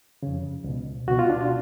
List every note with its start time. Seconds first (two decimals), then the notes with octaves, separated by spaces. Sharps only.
0.23 F2 C#3
0.64 C#2 B2
1.08 C#2 B2 F#4
1.19 F4
1.30 D4
1.41 F4